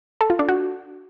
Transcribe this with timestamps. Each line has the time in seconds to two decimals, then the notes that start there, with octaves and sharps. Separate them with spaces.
0.21 A4
0.30 F4
0.39 D4
0.49 F#4